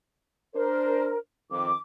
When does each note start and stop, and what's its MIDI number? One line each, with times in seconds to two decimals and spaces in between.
0.55 1.14 62
0.55 1.17 70
0.55 1.14 72
1.51 1.71 41
1.51 1.71 51
1.51 1.78 86